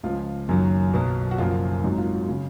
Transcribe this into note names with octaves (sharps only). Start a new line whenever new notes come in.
C#2 C#3 F3 F4
F#1 F#2 D#3 F#3
B1 B2 F#3
F#4
F#1 F#2 F3 F4
G#1 G#2 F#3 D#4
F4
F#4
C#3